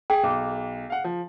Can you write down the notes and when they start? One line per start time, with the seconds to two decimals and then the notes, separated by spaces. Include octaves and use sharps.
0.10 G#4 G5
0.24 B1 G#4
0.90 F5 F#5
1.04 F3